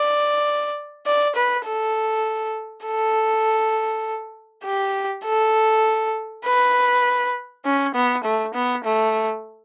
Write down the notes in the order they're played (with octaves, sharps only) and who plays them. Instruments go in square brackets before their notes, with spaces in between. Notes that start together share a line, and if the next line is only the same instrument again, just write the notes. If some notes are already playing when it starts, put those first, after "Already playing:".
Already playing: [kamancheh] D5
D5
B4
A4
A4
G4
A4
B4
C#4
B3
A3
B3
A3